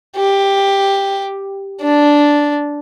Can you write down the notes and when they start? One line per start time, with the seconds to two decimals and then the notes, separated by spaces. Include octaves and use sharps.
0.16 G4
1.81 D4